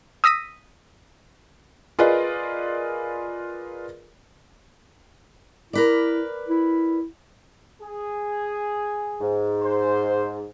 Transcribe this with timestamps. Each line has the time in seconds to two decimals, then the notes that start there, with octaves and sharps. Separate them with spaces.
0.24 D#6 E6 A#6 B6 D#7
1.99 F4 G#4 A#4 B4 D5 D#5
5.73 E4 A#4 B4 D5
6.49 E4
7.82 G#4
9.21 G#2
9.62 C5